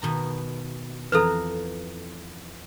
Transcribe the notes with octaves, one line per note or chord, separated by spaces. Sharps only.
B2 D#3 A#5
F2 E3 A4 B4 A#5